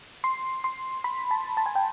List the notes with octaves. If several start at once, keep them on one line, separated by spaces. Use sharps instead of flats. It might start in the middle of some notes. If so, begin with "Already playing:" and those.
C6
C6
B5
A5
A5
G#5
G5